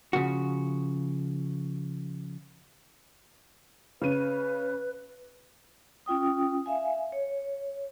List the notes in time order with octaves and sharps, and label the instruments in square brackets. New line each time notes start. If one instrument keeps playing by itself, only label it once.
[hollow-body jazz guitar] C#3 F3 F#4
[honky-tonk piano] C#3 D#7 [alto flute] B4
[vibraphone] C#4 F4 G5 D#6
E5 F5 G#5
C#5